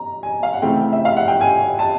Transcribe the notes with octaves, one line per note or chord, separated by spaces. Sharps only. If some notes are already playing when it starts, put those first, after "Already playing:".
Already playing: A#5
G#5
F5
F#5
C#3 E3 A3 C4 G5
E5
F5
F#5
G5
G#5
A5